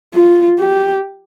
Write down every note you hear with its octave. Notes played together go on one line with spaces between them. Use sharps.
F4
G4